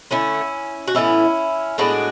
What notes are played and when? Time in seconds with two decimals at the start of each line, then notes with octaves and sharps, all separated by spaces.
0.11 D3 A3 C#4 E4
0.88 F#4
0.95 A2 E3 B3 C#4 E4
1.78 A2 G#3 B3 D4 F#4